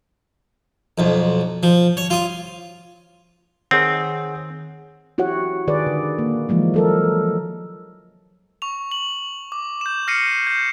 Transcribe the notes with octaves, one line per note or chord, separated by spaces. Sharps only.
B1 F2
F3
C#5
F4 D#6
D#3 C4 G#4 C#5 F#5
E4 F#4 G4 C#5 F#5
D#3 G#4 B4 D5
D3
A#3
E3 F3 G#3 A#3
F#3 A4 A#4
C#6 F7
F#7
D6
G6 E7
F6 A#6 C7 C#7 D#7
G6